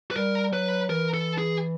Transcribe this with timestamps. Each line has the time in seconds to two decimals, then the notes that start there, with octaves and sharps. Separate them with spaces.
0.11 B4
0.16 G3 A#4
0.52 F#3 B4
0.89 E3 A#4
1.14 A4
1.38 G#4